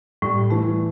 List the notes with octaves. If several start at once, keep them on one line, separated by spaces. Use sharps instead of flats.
A2 G3
E3 A3